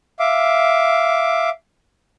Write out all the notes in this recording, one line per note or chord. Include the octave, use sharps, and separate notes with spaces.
E5 F5 D6